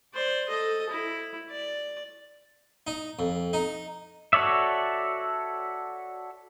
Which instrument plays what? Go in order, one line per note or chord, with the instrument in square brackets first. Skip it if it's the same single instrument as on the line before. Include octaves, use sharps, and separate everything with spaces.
[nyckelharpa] C5 D5
A4 D#5
E4
D5
[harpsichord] D#4
F2
D#4
[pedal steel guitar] F#4 A4 C#5 D5 E5